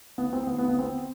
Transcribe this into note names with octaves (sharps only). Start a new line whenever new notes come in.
B3
C4
B3
B3
B3
C4